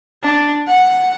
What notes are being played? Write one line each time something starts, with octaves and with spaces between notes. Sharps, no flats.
D4
F#5